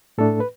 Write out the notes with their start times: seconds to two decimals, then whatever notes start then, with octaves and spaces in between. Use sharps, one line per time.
0.18 A2 A3 D4 A4
0.40 B4